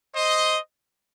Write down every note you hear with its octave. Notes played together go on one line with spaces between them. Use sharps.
C5 D#5